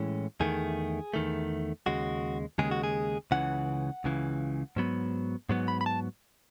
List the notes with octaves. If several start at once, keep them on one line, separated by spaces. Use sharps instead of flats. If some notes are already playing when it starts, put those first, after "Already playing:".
Already playing: A2 E3 G#3 C#4
E2 D#3 A3 G#4
E2 D#3 A3
D#2 C#3 G#3 F#4
D#2 C#3 G#3 G#4
F#4
G#4
C#2 C#3 E3 F#5
C#2 C#3 E3
G#2 F#3 B3
G#2 F#3 B3
B5
B5
A5